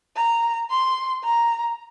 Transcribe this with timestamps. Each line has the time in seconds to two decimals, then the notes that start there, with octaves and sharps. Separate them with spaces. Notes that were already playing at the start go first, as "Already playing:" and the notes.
0.16 A#5
0.70 C6
1.24 A#5